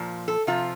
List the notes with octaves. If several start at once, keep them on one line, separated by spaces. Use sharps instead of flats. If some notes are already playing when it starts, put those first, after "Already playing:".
Already playing: A#2 F3
A4
C3 F3 F4